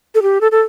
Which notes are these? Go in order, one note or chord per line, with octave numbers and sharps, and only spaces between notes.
A4
G4
A4
A4